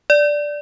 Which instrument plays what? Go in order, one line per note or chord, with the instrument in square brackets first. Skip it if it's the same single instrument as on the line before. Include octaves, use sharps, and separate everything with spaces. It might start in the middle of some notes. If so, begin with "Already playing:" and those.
[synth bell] D5